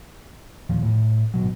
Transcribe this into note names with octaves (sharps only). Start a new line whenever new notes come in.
E1 D#2 A#2 F3
A2
G#1 D#2 B2 F#3